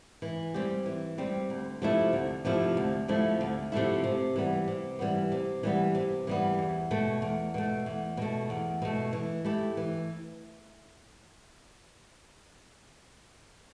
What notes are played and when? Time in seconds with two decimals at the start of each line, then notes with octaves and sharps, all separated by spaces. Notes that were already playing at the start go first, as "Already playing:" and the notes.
0.22 E3
0.54 G3 C4 G4
0.86 E3
1.18 G3 C4 G4
1.50 D2
1.82 C3 F3 A3 E4
2.13 D2
2.45 C3 F3 A3 E4
2.77 D2
3.08 C3 F3 A3 E4
3.41 D2
3.72 C3 F3 A3 E4
4.04 C3
4.36 E3 G3 B3
4.68 C3
4.99 E3 G3 B3
5.32 C3
5.63 E3 G3 B3
5.95 C3
6.27 E3 G3 B3
6.59 E2
6.91 B2 A3
7.22 E2
7.54 B2 A3
7.86 E2
8.17 B2 A3
8.50 E2
8.82 B2 A3
9.13 E3
9.45 A3 E4 G4
9.77 E3